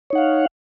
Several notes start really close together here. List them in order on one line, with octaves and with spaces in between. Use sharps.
C#5 D#4 F#5 F5